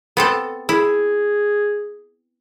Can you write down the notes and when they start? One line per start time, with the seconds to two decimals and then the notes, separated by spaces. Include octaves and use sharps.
0.17 B3 C4 A4
0.69 E4 G#4